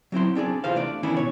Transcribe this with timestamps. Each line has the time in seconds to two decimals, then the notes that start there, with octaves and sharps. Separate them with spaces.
0.12 F#3 C4 E4 C6
0.35 C4 D4 G#4 D5
0.64 C3 E3 F4 C5 F5
0.76 A3 D4 D5
1.03 D#3 E3 B3 C#4 D4 E4
1.17 B2 C#5